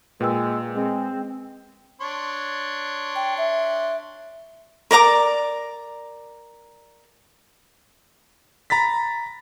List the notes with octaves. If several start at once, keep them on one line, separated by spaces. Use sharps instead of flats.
A#2 G#3 B4 G5 E6
G#3 C4
D4 C#5 C6
G5
E5
A#4 D5 A#5 D6
A#5 B5 A6 B6